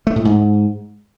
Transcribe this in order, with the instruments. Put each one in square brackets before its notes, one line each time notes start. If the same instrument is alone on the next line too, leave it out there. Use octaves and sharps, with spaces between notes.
[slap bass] A3
A2
G#2